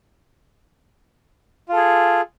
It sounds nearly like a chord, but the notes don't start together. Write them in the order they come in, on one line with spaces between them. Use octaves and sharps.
F4 A4 G#4